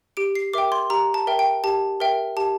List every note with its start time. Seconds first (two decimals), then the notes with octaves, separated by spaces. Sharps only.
0.17 G4 D7
0.35 C7
0.53 A#4 E5 G5 D6
0.72 C6
0.90 G4 A#5
1.14 A5
1.27 A#4 E5 G5
1.39 G5
1.64 G4 A5
2.00 A#4 E5 G5
2.37 G4 A5